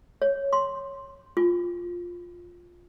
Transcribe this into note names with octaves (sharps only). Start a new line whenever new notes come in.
C#5
C6
F4